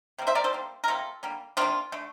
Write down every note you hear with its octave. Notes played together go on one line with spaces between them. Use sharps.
C3 G3 A#3
C5 E5
A#4 D5
A4 C5
D3 G3 A#3
A#4
C3 G3 A#3 F4 A4
D3 G3 A#3
C3 F3 A#3 D4 F4
D3 A3